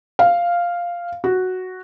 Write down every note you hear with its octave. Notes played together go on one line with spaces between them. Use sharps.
F5
F#4